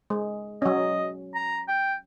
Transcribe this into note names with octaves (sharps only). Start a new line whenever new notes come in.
G#3
F#3 C#4 D#5
A#5
G5